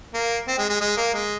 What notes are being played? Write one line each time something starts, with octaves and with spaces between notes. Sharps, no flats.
A#3
C4
G#3
G#3
G#3
A#3
G#3